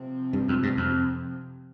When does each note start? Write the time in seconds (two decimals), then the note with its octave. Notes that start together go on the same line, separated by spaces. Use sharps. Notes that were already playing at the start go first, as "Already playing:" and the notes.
Already playing: C3 F3 C4
0.33 G2
0.48 F2
0.63 G2
0.77 F2